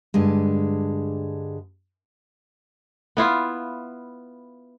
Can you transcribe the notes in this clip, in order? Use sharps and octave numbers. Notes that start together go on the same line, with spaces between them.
G2 D3 G3 G#3
B3 E4 F4